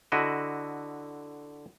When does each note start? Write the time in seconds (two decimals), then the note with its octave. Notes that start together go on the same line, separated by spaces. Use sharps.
0.12 D3 E4 F#4 D#5